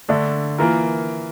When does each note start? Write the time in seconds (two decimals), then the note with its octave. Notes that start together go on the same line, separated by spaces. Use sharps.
0.09 D3 A3 D4
0.58 E3 A#3 F4 A#4